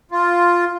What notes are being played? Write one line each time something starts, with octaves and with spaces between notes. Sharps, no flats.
F4